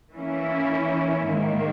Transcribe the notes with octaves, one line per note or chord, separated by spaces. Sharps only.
E3 A#3 C#4 E4
G#2 D#3 A#3